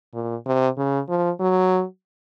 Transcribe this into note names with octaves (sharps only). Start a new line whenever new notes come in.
A#2
C3
C#3
F3
F#3